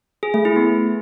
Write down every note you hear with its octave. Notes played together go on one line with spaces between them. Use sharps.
G#4
A3
E4
B3